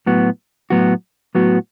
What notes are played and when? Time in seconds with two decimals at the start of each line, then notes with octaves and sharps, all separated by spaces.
0.06 A2 F#3 B3 F#4
0.70 A2 F#3 B3 F#4
1.35 A2 F#3 B3 F#4